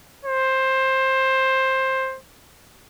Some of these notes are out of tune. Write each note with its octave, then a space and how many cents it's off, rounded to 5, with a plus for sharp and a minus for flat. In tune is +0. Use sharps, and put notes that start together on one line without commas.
C5 +15